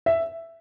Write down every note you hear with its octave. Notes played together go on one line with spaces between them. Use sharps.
E5